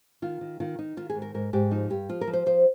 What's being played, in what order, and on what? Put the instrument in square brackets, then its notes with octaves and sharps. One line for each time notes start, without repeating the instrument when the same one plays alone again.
[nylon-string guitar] D#3 F4
D#3
D#3 F4
D#3 D#4
D#3 F4
G#4
G#2
A#4
G#2 A#4
G#2 G4
F3 D#4
G2 G4
F3 F4
A#4
F3
C5
F3 C5